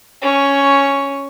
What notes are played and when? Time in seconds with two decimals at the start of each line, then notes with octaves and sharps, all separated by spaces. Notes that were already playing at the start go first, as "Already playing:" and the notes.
0.22 C#4 C#6